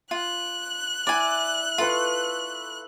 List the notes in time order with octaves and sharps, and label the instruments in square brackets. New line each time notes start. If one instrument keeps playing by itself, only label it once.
[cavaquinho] F4 [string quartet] F#6
[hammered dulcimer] E4 [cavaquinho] D5 G#5
[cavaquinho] F4 [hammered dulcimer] A4 B4 C#6